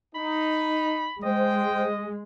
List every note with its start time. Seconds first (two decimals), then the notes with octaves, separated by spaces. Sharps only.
0.15 D#4 B5
1.23 G#3 C5 D#5 G5